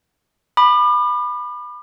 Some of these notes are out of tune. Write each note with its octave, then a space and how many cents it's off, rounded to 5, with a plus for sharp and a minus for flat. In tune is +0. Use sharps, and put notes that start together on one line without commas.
B5 +0 D6 +45